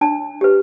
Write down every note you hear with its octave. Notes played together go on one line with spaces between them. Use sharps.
D4 A5
G4 B4